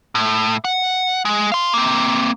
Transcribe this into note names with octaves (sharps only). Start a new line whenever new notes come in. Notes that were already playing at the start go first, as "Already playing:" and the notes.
A2
F#5
G#3
F5 C6
A#3 C4